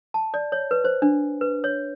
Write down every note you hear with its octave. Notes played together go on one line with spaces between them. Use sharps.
A5
D5
C#5
B4
C5
D4
B4
C#5